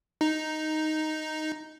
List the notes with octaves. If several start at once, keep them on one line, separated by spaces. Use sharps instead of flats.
D#4